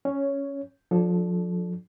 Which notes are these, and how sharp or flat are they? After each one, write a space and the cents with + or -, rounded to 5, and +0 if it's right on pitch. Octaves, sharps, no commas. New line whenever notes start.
C#4 +0 C#5 +10
F3 +30 D4 +0 A4 -15